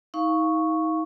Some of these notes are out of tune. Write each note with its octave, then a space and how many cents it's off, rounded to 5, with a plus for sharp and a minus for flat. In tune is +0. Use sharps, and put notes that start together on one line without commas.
D#4 +35 F5 +0 C#6 +0